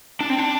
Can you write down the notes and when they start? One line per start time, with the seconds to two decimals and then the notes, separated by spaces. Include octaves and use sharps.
0.21 D4
0.30 C4
0.38 D4